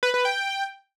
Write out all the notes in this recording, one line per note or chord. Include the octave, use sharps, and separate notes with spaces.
B4
B4
G5